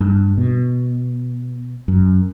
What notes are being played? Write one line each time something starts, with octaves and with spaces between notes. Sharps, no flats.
G2
B2
F#2